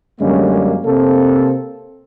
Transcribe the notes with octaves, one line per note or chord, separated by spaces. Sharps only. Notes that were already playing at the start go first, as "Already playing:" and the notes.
F#2 D3 G3 G#3 A#3 C#4
C3 A#3 C4 A4